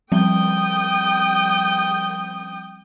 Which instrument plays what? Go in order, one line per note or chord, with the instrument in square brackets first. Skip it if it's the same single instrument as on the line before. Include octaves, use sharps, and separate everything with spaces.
[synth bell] F3 G3 C4 [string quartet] G5 D#6 G6